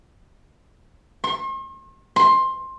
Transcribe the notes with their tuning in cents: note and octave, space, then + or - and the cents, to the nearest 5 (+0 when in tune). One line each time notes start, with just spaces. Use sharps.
C6 +45
C6 +15